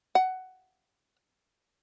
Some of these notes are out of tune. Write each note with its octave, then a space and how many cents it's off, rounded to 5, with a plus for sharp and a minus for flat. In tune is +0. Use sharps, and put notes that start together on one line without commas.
F#5 +15